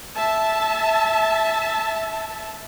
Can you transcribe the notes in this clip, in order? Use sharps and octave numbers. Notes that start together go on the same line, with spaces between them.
E5 A5